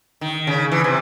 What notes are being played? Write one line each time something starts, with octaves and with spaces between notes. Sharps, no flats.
D#3
C#3
E3
C3